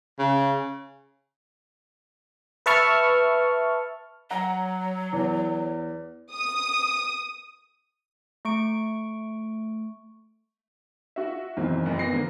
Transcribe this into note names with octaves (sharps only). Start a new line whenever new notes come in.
C#3
B4 E5 A5 C#6 F6
F#3 F#5 A#5
E2
D#6
A3 C#6 D7
F4 F#4 E5
F#1 B1 E2 D#3 E3 C4
F#1 F2
B3 A#6 C7
D3 F3 A#3